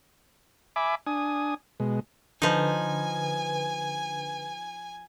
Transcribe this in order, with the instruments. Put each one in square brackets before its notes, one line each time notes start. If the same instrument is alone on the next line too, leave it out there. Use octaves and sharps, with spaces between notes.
[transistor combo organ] E5 G#5 B5 D6
D4 G#5 D#6
B2 G#3
[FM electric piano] D3 B4 [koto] F3 D#4 [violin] G#5